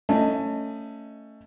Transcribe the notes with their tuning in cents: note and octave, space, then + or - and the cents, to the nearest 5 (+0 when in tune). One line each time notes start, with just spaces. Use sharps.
A3 +20 C#4 +5 D#5 +0